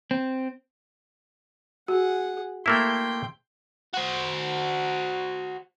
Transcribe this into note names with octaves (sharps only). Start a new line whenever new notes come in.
C4
F#4 G#4 F#5
A3 A#3 E4 G5 C6
F#4 C5